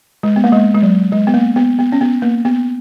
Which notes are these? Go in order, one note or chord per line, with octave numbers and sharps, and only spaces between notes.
G#3
B3
A#3
G#3
G#3
F#3
G#3
B3
A#3
B3
B3
C#4
B3
A#3
B3